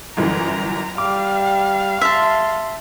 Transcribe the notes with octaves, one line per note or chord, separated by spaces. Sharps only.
G1 F#2 E3 A#5
G3 F5 D6
E5 A5 C6